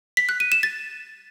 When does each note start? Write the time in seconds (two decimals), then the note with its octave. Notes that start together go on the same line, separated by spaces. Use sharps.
0.17 B6
0.29 F#6
0.40 D#7
0.52 E7
0.63 A6